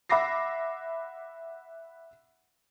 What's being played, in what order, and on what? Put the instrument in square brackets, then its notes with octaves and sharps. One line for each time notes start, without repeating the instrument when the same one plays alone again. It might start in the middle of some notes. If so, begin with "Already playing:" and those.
[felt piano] E5 F#5 B5 D6 A#6 C7